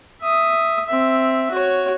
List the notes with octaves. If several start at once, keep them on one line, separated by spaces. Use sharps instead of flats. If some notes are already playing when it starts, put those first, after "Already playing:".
E5 D#6
C4 E5
F#4 C#5